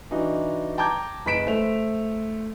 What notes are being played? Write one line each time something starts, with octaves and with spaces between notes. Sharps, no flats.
E3 D4 D#4 F#4
G5 A5 A#5 D6 G6 G#6
F#1 B4 D#5 B6 D7 E7
A3 C5 F7